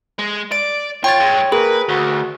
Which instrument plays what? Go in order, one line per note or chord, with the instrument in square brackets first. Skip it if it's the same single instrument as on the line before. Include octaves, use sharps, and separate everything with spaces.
[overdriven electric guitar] G#3
[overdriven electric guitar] D5 [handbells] D7
[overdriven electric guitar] F4 [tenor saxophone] C#5 [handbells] G5 A6
[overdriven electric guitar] G2 G#3
[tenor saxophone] A#3 [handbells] G#4 [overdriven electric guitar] B4
[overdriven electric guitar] D2 [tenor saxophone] F#4